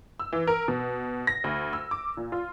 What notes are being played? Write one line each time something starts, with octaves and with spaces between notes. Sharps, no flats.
E6
E3
A#4
B2
A#6
D2
E6
D6
A#2
F4